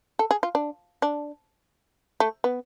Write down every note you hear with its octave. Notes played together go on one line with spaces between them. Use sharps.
A4
G#4
F4
D4
D4
A3
B3